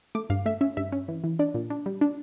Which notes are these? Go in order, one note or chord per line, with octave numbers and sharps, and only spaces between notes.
A3 D6
G2 F5
A3 E5
C#4 E5
G2 E5
C#4
E3
E3
D4 D5
A#2
D4
G3
D4